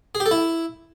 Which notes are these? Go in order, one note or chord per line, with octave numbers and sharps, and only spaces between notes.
G#4
G4
A4
E4